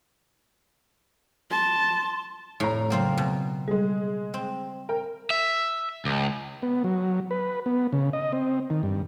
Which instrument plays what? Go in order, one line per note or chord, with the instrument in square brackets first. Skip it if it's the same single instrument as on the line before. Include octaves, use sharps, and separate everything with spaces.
[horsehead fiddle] A5 [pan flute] C6
[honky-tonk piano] F1 A#5 [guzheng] A2
[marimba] C#3 F#3 [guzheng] A#3 C4 F4
[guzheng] B2
[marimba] G3 [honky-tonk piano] G#3 G#4
[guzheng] C4
[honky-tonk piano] A#4 G5
[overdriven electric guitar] E5
C#2
[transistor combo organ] B3
F#3
B4
B3
C#3
D#5
C4
D#3
G2